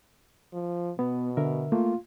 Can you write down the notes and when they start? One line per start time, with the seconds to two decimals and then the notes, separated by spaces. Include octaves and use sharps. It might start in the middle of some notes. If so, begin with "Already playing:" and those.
0.53 F3
0.99 B2 B3
1.37 D3 A#4 E5
1.72 A3 A#3 F4